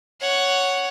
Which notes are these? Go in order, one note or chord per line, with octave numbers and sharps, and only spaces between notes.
C#5 F#5